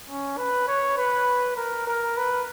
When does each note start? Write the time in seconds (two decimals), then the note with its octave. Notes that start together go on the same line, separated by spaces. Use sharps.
0.09 C#4
0.37 B4
0.68 C#5
0.98 B4
1.57 A#4
1.87 A#4
2.17 B4